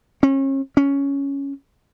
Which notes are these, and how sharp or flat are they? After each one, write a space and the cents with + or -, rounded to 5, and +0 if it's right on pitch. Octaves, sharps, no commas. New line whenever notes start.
C#4 -35
C#4 +5